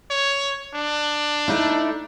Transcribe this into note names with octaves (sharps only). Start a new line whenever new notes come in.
C#5
D4
A3 D#4 E4